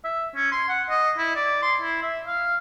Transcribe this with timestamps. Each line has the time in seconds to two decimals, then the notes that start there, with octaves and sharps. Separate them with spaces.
0.05 E5
0.36 C#4
0.52 C6
0.69 F#5
0.90 D#5
1.18 E4
1.35 D5
1.63 C6
1.81 E4
2.03 E5
2.27 F5